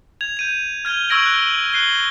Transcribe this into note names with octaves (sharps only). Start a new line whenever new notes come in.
G#6 F7
G6 D#7 F7
F6 G#6 D#7 G7
C#6 E6 G#6 A#6 D7 F#7
F#6 G7
F#6 C7 G7